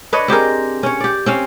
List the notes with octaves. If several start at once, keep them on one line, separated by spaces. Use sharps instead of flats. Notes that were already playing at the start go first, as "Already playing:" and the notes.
D4 B4 C#5 D#5
C4 G4 G#4 A#4
C#4 C#5
G4 D5
C4 C#4 F5